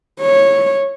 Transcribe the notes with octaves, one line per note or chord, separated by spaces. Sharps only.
C#5